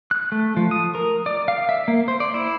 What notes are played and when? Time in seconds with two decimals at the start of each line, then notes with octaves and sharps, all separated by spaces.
0.11 F#6
0.32 A3
0.57 F3
0.71 D#6
0.95 A#4
1.26 D5
1.48 F5
1.69 E5
1.88 A#3
2.08 C5
2.20 D5
2.34 E4